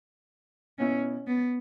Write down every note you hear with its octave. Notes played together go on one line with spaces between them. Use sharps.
B2 B3 C#4 E4
B3